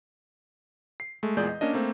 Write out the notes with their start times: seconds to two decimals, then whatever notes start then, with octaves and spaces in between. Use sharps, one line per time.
1.00 C7
1.23 G#3 A3
1.37 E2 A#2 G#3 G#4 D5 G6
1.49 D#5
1.61 A#3 C#4 D4 D#5
1.73 A3 A#3 C4